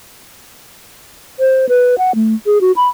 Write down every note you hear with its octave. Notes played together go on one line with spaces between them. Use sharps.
C5
B4
F#5
A3
G#4
F#4
B5